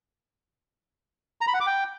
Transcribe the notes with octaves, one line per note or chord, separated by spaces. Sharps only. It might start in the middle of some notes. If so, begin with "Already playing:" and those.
A#5
B5
F#5
D6
G5